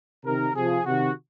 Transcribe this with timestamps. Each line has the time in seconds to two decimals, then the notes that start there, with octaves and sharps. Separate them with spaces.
0.24 C3 D#3 A#4
0.54 C3 F3 G#4
0.85 C3 D#3 F#4